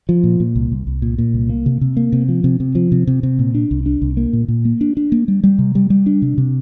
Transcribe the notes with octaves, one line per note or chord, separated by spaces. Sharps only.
F3
A#2
A#2
C2
C2
C2
A#2
A#2
C2
A#3
C3
C3
A#3
C3
F3
C3
C3
F3
C3
C3
C3
A#2
D4
C2
D4
C2
A#3
A#2
A#2
A#3
D4
D4
A#3
G3
G3
C3
G3
G3
D4
C3
C3